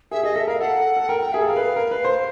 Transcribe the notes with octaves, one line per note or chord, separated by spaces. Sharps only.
G#4 E5
G#4 D#5
A4 E5
A#4 F5
A4 F#5
A4
A#4 G5
G5
G#4 E5
A4
A#4 F5
B4
A#4
B4
C5